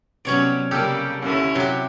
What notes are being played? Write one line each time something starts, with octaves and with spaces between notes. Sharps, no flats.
C3 F#3 B3 C#4 C#5 D5
C#3 G3 A#3 G4 A4 G5 F6
D#2 D3 C#4 E4 C#5
C3 F#3 G4